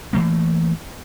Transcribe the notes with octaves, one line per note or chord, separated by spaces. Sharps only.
E3 F#3 A3 A#3